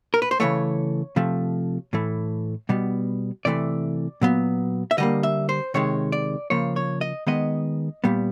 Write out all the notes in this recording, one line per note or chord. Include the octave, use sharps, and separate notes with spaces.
A#4
B4
C5
C#3 E3 A3 C#5
C3 F3 A3
A2 E3 A3
B2 G3 B3
C3 E3 A3 D5
A#2 F#3 B3
E5
D3 G3 A#3 D#5
E5
C5
C3 D#3 G#3 C#5
D5
C#3 F3 A#3 C#5
C#5
D#5
D#3 G#3 B3 D#5
A#2 G3 B3